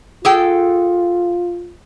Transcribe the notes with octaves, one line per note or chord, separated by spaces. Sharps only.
F4 G#4 A4 G5